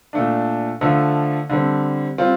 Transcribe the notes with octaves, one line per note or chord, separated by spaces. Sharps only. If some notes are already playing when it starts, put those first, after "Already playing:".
A#2 A3 D4
D3 F3 A3
D3 G3 C4
G3 C4 F4